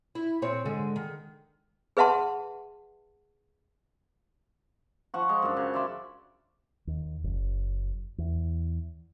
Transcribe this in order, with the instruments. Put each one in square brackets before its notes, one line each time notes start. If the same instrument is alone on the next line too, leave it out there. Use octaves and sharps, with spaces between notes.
[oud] E4
A#2 C4 C#5
G#2 D3 G#3
D#3
[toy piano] G#4 B4 E5 F#5 A5 C6
[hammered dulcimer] F3 F#5 C#6
G#3
F#2 D4
C#3
D5 E5 C6
[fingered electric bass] D#2
F#1
E2